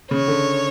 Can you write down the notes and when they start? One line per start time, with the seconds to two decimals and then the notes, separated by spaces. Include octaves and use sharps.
0.11 C#3 C#5
0.28 D3